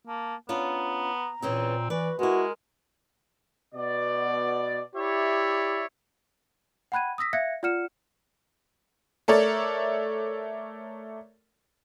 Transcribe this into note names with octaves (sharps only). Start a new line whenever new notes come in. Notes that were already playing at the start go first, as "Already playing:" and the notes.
A#3 A5
B3 C#4 D4 F4 A#5
A#2 E3 C4 C#4 G#4
E3 F#4 B4 D5
G#3 B3 E4 F#4 A#4
B2 D5
E4 G4 C#5 D5 E5
F#5 G5 B5 F#6 G#6 D#7
D#6 E6 A#6 B6
E5 F5 F#6 G#6 A#6 C#7
F4 D5 F#5 F6 C#7 E7
A3 A4 A#4 C#5 D5